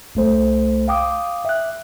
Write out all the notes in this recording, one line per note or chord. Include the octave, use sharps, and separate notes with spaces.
C2 A3 C5
F5 G5 D6 D#6
E5 F#6